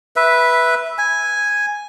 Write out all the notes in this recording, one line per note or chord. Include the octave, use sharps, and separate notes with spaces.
B4 E5
G#5